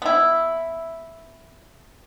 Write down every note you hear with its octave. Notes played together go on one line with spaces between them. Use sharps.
B3 E4